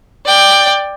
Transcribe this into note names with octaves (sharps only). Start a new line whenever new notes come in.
D5 G5